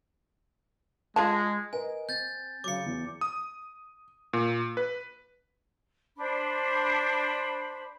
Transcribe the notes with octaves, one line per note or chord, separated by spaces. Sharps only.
G#3 F4 G#4 A5
A#4 B4 D#5 G#5
C4 G6 A6
C#3 F#3 D6 C#7
E2
D#6
A#2
B4
D4 C5 B5